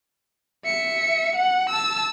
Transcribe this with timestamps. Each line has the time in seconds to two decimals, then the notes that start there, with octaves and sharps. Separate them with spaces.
0.65 E5 C#7
1.36 F#5
1.70 A5 E6